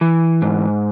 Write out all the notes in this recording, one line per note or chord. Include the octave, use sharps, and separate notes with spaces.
E3
G#2